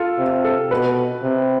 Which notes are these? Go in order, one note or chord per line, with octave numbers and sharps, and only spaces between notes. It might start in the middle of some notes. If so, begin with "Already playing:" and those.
Already playing: F4 A4
C3
A4
B2 B4
C3